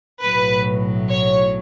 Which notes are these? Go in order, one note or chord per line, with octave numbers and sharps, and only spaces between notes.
B1 A2 F#3 B4
C#5